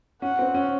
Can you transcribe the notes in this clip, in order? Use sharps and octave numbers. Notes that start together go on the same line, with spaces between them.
C#4 F#5
C4
C#4